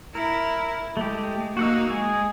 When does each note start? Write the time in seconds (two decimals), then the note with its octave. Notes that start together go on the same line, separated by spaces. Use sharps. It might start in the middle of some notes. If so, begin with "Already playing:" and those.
0.15 E4 A#4
0.97 G#3 A3 G4
1.57 A#3 D#4 F#4 F#5 E6
1.90 G#3 G#4